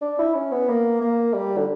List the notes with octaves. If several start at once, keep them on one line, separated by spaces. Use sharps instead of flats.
D4
E4
C#4
B3
A#3
A#3
G3
D3